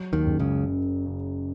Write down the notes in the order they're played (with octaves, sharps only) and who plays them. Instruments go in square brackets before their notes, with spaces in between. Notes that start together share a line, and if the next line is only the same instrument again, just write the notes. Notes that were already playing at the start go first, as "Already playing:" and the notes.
Already playing: [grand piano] F#3
[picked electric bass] D#2 D#3
[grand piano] F#1
[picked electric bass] C#2 C#3
[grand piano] F#2
C#3